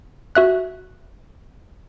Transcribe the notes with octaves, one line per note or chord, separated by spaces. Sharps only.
F#4 E5 F#6